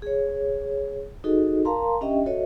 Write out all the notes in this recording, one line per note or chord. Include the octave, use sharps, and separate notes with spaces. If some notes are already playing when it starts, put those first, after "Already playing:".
G#4 C#5
D#4 F#4 G#4 A4 D#5
A#4 F5 A5 A#5 C6
C#4 D4 G4 D#5 E5 G5
F#4 A4 C#5 D#5 E5